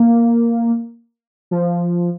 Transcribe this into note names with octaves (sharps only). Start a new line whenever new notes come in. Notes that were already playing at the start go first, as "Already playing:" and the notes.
Already playing: A#3
F3